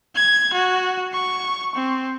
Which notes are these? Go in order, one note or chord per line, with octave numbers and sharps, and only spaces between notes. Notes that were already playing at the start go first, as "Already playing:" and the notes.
G#6
F#4
C#6
C4